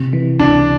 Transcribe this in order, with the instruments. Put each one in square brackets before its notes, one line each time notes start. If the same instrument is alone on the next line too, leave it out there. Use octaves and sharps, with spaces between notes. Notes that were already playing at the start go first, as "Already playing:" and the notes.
Already playing: [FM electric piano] C3
E3
[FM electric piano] C#2 [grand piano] D4